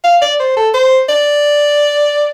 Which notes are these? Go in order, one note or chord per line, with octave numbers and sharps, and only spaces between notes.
F5
D5
C5
A4
C5
D5